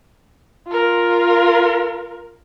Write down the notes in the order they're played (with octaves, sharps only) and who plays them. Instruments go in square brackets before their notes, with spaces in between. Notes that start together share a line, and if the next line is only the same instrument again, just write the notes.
[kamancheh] F4 A#4